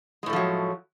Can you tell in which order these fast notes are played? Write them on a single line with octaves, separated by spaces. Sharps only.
G#3 A2 A3 F3 F#3